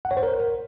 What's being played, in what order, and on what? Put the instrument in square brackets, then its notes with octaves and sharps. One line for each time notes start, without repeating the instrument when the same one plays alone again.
[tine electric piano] F#5
C#5
C5
A#4